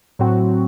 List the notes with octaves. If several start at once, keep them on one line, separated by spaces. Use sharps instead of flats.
A2 F#3 C4 F#4